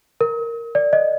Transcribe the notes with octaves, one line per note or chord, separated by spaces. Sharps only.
A#4
D5
D#5